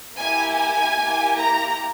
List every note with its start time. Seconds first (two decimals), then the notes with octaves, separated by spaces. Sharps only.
0.17 A#3 E4 G4 G#5
0.57 G#5
0.97 A#3 E4 G4
1.37 A#5